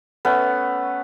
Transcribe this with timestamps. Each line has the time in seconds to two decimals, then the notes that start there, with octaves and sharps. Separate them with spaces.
0.25 A3 B3 C#4